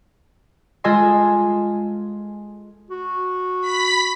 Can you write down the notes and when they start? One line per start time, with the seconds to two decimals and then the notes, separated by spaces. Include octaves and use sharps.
0.84 G#3 F4 A4 D#5 G#5 C6
2.91 F#4
3.60 B5 B6